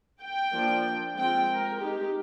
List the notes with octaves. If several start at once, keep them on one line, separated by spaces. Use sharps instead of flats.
G5
F3 A#3 D4
G#3 C4 F4 G5
A#4
G#3 D#4 G4